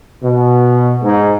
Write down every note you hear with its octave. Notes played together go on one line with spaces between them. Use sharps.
B2
G#2